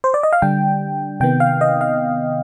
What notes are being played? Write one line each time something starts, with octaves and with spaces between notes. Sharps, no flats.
C5
D5
D#5
F5
D3 G3 D4 G5
C3 D#3 B3 G5
F5
D#5
F5